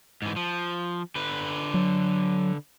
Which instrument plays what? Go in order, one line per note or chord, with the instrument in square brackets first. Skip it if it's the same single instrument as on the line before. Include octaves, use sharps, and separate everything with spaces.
[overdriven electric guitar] G#2 E3
F3
D3 B4
[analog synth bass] F#3